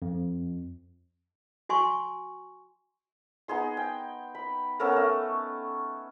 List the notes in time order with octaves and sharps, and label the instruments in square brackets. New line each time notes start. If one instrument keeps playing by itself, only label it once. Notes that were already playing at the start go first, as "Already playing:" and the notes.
[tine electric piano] F2
[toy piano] F#4 G#5 C6 C#6
[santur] B3 D#4 G#4 C6
G5
B5
B3 C#4 A4 A#4
A3 C#4